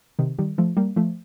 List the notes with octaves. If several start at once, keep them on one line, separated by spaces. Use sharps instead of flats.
C3 D#3
D#3 G3
F3 A3
G3 A#3
F3 A3